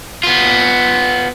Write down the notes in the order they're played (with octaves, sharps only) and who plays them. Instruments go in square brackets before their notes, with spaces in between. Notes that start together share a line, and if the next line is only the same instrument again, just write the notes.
[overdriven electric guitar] B3 F4